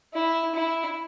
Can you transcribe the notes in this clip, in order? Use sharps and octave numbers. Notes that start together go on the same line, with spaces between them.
E4
E4